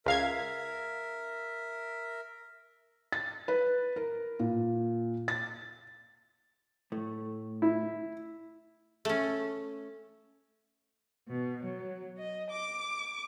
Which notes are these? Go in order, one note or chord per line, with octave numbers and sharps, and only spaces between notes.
C#2 A#4 E5 F5 G#6
A6
B4
A#4
A#2
A6
A2 A3
E4
A3 C#4
B2
F#3
D#5
D6